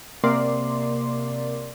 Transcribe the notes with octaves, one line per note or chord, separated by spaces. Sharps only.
C3 A#3 D5 C6